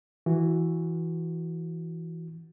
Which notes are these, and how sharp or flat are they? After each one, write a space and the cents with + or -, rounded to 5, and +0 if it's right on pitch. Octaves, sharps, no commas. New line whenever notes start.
E3 +0 F#4 -5